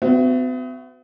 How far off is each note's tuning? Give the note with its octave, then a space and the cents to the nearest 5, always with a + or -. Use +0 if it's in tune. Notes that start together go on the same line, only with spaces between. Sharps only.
B3 +45 F#4 +0 E5 +30